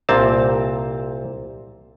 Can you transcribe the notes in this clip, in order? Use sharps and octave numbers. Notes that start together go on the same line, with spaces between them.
C2 A#2 C4 A5